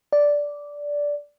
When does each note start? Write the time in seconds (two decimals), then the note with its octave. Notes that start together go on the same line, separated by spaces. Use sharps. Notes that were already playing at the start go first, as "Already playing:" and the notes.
0.13 D5